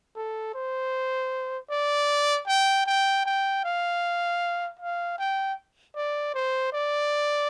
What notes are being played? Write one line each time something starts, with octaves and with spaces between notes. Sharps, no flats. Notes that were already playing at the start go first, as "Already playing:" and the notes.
A4
C5
D5
G5
G5
G5
F5
F5
G5
D5
C5
D5